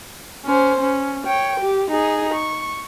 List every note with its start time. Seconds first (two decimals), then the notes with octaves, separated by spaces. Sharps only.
0.45 C#4 C5
0.80 C#4
1.26 C#5 G5
1.60 G4
1.90 D#4 G#4
2.34 C#6